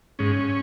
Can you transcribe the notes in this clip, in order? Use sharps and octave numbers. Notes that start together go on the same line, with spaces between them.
G#2 C#4